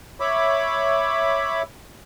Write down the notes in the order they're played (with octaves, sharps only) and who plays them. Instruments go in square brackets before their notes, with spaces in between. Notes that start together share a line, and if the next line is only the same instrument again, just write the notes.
[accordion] C#5 E5 B5 D6